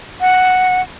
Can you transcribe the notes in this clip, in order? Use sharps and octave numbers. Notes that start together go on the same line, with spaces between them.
F#5